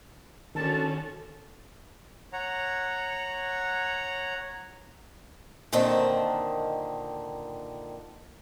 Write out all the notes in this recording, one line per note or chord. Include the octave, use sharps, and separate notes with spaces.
D3 D#3 C#4 F#4 A5
C#5 F#5 A#5
A#2 D3 D#3 C4 D#5 A5